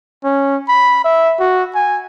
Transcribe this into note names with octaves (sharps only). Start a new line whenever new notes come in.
C#4
B5
E5
F#4
G#5